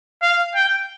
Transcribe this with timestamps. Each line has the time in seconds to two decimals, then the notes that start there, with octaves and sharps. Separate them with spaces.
0.22 F5
0.55 G5